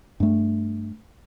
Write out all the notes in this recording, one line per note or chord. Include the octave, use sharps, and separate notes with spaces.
G2 A3